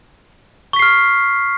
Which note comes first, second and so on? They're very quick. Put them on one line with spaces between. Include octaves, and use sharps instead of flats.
C#6 B6 C7 F6